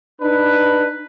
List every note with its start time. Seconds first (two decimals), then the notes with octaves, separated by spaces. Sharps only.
0.21 D4 D#4 B4